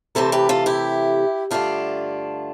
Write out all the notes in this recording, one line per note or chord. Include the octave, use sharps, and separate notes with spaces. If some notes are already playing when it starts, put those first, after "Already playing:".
C3 E3 A3 A4 C5
G4 B4
F4 A4
E4 G4
G2 D3 A3 D4 F4